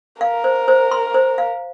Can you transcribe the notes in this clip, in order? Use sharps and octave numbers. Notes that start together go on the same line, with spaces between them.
A#4 F5
C5
C5
C6
C5
F5